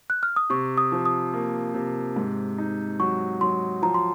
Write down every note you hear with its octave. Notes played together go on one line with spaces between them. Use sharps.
F#6
F6
D#6
C3 C#6
D#6
F3
D#6
A#3
C3
G#2
D#4
F#3 C#6
F#3 C6
F3 A#5
C6